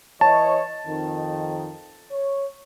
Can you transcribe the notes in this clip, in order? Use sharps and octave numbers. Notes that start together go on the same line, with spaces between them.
E3 C#5 D#5 A5
F2 D#3
C#5